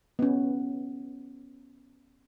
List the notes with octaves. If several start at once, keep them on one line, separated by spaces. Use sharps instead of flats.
B3 C#4